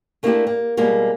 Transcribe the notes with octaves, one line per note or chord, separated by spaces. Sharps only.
A3 A#3 D4 E4 F#4 G4
A#3
B2 G3 G#3 A#3 F4